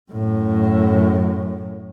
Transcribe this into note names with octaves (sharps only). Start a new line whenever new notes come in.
F#2 A2